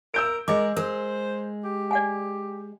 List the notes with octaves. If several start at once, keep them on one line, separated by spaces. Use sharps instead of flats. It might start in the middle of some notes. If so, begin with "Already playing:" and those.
A#4 E6 G6 D7
G#3 G#4 A#4 D#5 D6
G#3 A#4 C5
G4
D5 F#5 G#5